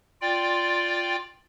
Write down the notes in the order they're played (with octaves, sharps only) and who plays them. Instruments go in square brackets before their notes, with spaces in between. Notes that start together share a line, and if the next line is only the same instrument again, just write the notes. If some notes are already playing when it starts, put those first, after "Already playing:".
[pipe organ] F4 D5 G5